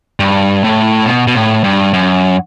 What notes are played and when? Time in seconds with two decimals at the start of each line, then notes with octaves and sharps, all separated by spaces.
0.20 G2
0.64 A2
1.06 B2
1.27 B2
1.35 A2
1.64 G2
1.93 F#2